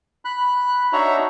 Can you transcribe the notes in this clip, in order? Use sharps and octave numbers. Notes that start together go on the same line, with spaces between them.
B5 F#6
D4 D#4 F#4 C#5 E5 A#5